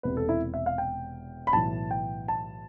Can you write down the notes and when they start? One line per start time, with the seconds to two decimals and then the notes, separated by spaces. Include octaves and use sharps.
0.03 E1 E2 C3 B4
0.17 A4
0.29 E4
0.54 E5
0.66 F5
0.78 G5
1.47 B5
1.53 B1 A2 E3 A5
1.91 G5
2.28 A5